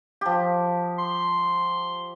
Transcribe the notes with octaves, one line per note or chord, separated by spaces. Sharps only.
F3 G4
C6